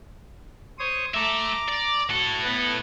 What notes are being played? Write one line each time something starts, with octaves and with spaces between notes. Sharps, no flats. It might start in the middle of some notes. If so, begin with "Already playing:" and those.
C5 C#5 D#6
A4 E5 A#5 D6
D5
A2 F#4 A4
B3 B4